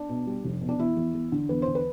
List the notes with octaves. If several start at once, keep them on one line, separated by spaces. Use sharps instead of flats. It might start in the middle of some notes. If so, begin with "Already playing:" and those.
Already playing: D4
B2
G3
F1
B2
D4
E2 E4
E2
E2
D3
E2 B4
C5
D3
B4